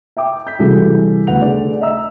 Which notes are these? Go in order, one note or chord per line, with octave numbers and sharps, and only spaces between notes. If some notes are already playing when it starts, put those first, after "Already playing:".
E5 G5 D6
G6 B6
C3 E3 G3 F#4 G#4 A4
D2 B3 F#5 F7
A3 D4 G#4 D5
D#5 E5 A#5 E6